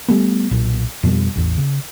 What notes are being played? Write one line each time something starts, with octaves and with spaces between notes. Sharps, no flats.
G3 A3 B3
B1 A#2
F2 B2 F3 G3
A1 E2
C#3